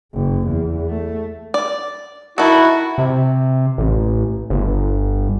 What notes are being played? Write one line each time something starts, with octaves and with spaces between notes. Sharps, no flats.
F#1
E2
A3
D5
D#3 E4 F#4 A4
C3
A1
G1